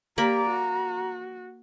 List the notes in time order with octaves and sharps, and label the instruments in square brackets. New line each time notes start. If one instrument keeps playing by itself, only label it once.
[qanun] A#3 B5 [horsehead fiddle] G4 D5 [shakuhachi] A#5
[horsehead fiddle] F#4